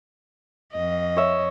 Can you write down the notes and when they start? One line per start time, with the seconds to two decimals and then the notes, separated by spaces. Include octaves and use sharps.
0.73 F2 D#5
1.17 C#5 E5